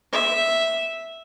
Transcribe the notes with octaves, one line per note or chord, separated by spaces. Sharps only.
E5